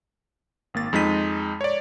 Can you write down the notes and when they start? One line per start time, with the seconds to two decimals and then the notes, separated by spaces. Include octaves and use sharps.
0.74 G#1 A#3 A6
0.93 F2 G#3 D#4 B6 D#7
1.61 C#5 D5